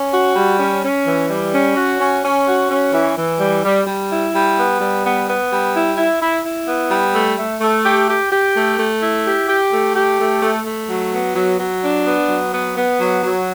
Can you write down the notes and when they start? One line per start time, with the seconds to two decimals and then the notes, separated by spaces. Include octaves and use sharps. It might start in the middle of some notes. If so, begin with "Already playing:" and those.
Already playing: C#4
0.13 F#4
0.35 G3
0.59 C#4
0.83 C#4
1.06 E3
1.29 G3
1.53 C#4
1.76 F#4
2.00 C#4
2.23 C#4
2.46 F#4
2.70 C#4
2.93 E3
3.16 E3
3.39 G3
3.64 G3
3.86 G3
4.10 E4
4.33 G3
4.57 B3
4.80 G3
5.04 B3
5.27 B3
5.50 G3
5.74 E4
5.97 E4
6.21 E4
6.44 E4
6.67 B3
6.91 G3
7.14 A3
7.38 A3
7.61 A3
7.84 G4
8.08 G4
8.31 G4
8.55 A3
8.78 A3
9.02 E4
9.25 G4
9.48 G4
9.72 A3
9.95 G4
10.19 A3
10.42 A3
10.65 A3
10.89 F#3
11.12 B3
11.36 F#3
11.59 F#3
11.83 D4
12.06 B3
12.29 F#3
12.53 B3
12.76 B3
13.00 F#3
13.23 F#3